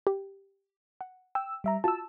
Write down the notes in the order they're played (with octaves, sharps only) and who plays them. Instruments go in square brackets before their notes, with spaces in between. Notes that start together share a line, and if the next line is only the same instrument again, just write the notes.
[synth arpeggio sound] G4
F#5
[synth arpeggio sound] G5 [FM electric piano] E6
[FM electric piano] G3 E5 A#5
[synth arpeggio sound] F4 F#4 [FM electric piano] A5 E6